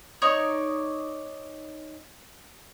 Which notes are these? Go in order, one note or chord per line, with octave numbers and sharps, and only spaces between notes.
D#4 C#5 D5 C#6